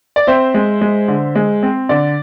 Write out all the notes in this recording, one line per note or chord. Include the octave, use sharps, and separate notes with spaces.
D5
C4 C5 E5
G#3
G#3
D3
G#3
C4
D3 D5